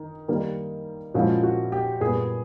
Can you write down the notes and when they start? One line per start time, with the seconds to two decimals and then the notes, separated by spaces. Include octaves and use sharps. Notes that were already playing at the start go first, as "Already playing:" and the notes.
Already playing: D#3
0.29 D#3 G3 A#3
1.14 A#2 F3 G#3 C#4 E4 F#4
1.43 F#4
1.72 G4
2.01 A#2 G3 B3 G#4